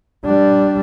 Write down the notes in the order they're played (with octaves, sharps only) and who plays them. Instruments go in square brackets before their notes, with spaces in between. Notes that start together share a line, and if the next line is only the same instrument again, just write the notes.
[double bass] G3 D4